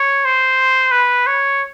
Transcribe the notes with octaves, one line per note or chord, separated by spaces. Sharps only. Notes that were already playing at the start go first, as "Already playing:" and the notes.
Already playing: C#5
C5
B4
C#5